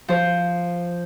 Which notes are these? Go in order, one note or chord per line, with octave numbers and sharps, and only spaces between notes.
F3 C5